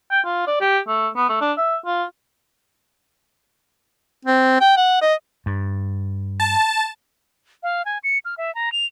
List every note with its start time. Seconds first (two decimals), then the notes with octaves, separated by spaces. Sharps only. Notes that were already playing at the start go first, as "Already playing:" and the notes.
0.11 G5
0.25 F4
0.47 D5
0.61 G4
0.87 A3
1.16 B3
1.29 A3
1.41 D4
1.57 E5
1.86 F4
4.25 C4
4.61 G5
4.77 F#5
5.01 D#5
5.46 G2
6.40 A5
7.63 F5
7.85 G#5
8.04 C#7
8.25 F6
8.38 E5
8.55 A#5
8.72 F7